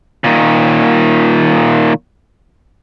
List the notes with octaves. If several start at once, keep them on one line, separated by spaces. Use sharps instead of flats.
A#2 D#3